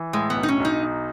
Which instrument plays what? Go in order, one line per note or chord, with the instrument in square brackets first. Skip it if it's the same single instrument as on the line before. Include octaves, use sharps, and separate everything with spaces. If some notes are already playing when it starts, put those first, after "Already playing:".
Already playing: [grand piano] E3
[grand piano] A2 [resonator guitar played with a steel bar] G#3
[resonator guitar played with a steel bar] B3
[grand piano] B1
[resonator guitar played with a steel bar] D#4
C#4
[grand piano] B1 [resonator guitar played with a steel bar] D#4
[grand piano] D#4